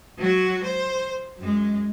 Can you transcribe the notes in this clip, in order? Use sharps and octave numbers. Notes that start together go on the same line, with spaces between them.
F#3 F#4
C5
F#2 G#3